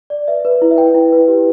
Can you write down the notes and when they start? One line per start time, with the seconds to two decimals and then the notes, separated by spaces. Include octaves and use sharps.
0.10 D5
0.28 B4 E5
0.45 B4
0.62 E4
0.71 E5
0.78 B4 G5
0.94 E4
1.12 B4
1.28 G4